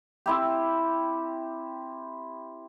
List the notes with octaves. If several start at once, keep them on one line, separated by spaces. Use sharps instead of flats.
C4 E4 G4